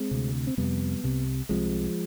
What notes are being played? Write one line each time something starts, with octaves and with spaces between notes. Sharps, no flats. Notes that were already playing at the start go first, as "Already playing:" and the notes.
Already playing: G#3 C4
D2 C3
C4
F2 C3 G3 B3
C2 C3
C2 C3 F3 G#3